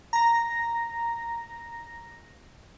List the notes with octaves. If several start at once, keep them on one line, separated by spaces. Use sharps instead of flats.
A#5 A#6